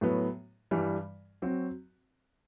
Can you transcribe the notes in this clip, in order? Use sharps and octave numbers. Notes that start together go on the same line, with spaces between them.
A2 F#3 B3
G2 E3 G3
F#3 C4 F#4